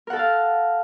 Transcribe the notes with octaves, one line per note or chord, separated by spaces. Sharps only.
A4 A#4 F5 F#5 A5